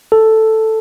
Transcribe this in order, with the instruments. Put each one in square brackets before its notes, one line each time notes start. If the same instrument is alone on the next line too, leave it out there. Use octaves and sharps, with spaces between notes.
[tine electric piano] A4